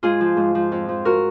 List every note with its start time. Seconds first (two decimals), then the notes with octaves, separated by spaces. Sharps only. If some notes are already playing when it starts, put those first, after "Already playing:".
0.03 G#2 F4 G#4
0.21 F3
0.37 G#2
0.55 F3
0.72 F2
0.89 F3
1.05 F#4 A#4